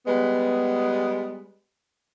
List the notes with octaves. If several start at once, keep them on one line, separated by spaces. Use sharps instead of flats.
G3 G#3 B3